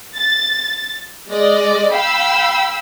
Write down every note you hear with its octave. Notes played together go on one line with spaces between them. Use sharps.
A6
G#3 D5 D#5
F5 G5 B5 E6